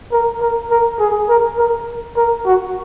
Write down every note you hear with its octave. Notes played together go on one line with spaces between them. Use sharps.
A#4
A#4
A#4
G#4
A#4
A#4
A#4
F#4